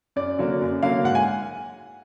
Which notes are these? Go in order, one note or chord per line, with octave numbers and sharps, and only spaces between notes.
F#2 D5
D3 F#3 A#3
F#2
D3 F#3 A#3 F5
G#2 F#5
G#5